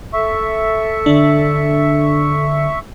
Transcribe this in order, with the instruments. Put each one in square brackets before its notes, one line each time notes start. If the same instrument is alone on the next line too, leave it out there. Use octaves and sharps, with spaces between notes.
[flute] A4 [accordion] E5 C#6
[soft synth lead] D3 [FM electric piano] D4